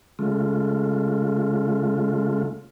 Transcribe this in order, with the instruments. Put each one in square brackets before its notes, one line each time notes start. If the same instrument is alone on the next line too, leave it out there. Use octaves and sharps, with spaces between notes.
[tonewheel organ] C#3 G#3 A3 F4